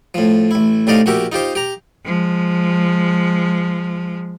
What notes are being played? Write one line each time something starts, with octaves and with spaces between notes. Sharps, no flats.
A2 F3
A1 E4
A2 C3 D#4 D5 D#5 F5
A#1 F#4 G4 A#4 E5
D#4 F4 G4 C5
G4 A#5
F3 G#3